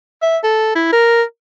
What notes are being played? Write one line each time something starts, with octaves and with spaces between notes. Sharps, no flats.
E5
A4
E4
A#4